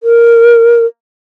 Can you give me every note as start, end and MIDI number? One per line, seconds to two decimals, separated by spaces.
0.03 0.85 70